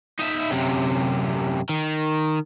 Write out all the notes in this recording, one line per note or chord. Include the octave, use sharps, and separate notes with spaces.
D#4 E5
F#2 C3
D#3